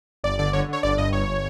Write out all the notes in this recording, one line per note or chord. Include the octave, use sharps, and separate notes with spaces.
G1 D5
D3 D5
D3 C#5
D3 C#5
G1 D5
G2 D#5
G1 C#5